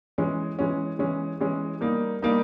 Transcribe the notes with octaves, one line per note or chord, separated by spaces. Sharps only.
E3 G#3 C#4
E3 G#3 C#4
E3 G#3 C#4
E3 G#3 C#4
G3 A#3 D#4
G3 A#3 D#4